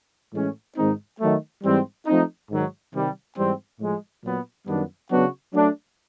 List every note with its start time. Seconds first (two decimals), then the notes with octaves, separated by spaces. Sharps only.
0.33 A2 E3 G#3 C#4
0.76 G#2 D#3 G#3 C4 D#4
1.20 D#3 F#3 A3
1.63 G#2 E3 G3 C4
2.07 F3 A3 C4 D#4
2.49 G#2 D#3 F#3
2.93 C3 D#3 G3
3.37 G#2 E3 G3 C4
3.80 A2 F3 G#3
4.23 A#2 F#3 B3
4.66 F#2 D#3 G3 B3 D4
5.10 C#3 F#3 B3 D4 F#4
5.53 F#3 A3 D4